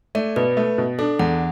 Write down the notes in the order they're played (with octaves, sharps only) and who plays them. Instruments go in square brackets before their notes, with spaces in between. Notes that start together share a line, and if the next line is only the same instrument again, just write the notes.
[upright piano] A3 [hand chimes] D5
[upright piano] B2 [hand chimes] B4
[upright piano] A3
B2
[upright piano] D4 [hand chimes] A4
[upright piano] E2 [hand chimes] F#5